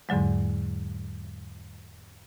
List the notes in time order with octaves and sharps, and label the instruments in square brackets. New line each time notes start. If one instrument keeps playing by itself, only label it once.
[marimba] E2 G#2 D3 F#3 G#3